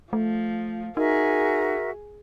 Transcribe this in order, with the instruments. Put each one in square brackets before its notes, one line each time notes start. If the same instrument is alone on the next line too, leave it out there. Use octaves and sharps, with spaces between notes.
[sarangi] F3 [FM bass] A3
[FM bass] D#4 [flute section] F#4 A#4 E5 [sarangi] G#4